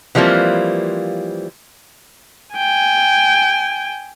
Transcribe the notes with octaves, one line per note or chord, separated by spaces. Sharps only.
E3 F3 G3 A#3 C4
G5 G#5